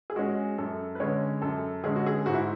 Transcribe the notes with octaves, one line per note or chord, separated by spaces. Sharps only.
G#4
G#3 C#4 F#4
F#2 A4
B4
D3 G#3 C#4 C#5
F#2 A4
D3 G#3 C#4 G#4
F#4
G#4
G#2 F#4
E4